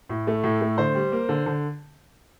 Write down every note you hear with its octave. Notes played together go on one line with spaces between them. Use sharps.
A2
A3
A2
A3
D3 C5
G3
A#3
D3
D3